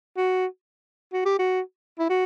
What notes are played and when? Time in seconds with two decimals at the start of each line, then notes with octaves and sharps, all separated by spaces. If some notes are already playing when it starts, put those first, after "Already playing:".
0.17 F#4
1.13 F#4
1.25 G4
1.39 F#4
1.99 E4
2.09 F#4